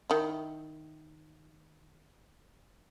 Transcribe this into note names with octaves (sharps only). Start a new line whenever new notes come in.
D#3 E4